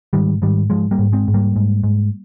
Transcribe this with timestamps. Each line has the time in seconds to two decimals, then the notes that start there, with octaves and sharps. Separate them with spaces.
0.13 G#2 D#3 G3
0.42 G#2 D#3 G3
0.70 G#2 F3 G#3
0.91 G3 A#3
0.99 G#2
1.13 G#3 C4
1.28 G#2
1.34 G3 A#3
1.56 G#2
1.84 G#2